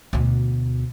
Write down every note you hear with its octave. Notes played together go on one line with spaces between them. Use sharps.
D2 B2